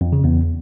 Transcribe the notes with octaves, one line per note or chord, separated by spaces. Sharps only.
F2
C#3
E2